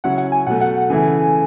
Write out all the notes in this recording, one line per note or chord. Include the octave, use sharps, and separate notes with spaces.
C#3 F#3 C#4 E4 F#5
F#5
G#5
B2 F#3 A3 F#5
F#5
F#5
C#3 E3 A3 E4 G#5